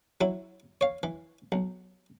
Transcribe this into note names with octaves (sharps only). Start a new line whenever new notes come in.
F#3 E4
C#5 F5
E3
B1